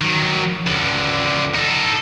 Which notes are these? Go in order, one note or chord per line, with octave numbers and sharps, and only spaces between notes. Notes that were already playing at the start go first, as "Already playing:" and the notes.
D#3 F#3
C#2 D3
D#4 A4